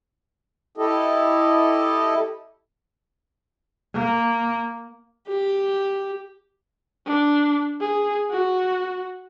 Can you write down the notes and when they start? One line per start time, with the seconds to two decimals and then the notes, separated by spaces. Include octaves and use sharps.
0.78 E4 G4 A4 D#5
3.94 A#3
5.28 G4
7.06 D4
7.81 G#4
8.30 F#4